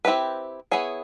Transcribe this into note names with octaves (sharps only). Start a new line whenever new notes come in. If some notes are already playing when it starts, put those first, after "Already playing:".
C4 E4 G4 B4
B3 E4 G#4 C#5